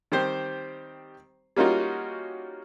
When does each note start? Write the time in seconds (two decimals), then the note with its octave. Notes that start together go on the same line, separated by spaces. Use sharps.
0.12 D#3 G3 C4 G4 C5
1.56 G3 A#3 C#4 D#4 F4 F#4